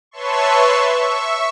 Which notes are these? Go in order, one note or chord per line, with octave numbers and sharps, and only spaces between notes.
B4 C#5 E5 A5 C6 C#6
E5 C#6